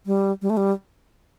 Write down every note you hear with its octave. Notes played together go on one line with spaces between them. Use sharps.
G3
G3
A3
G3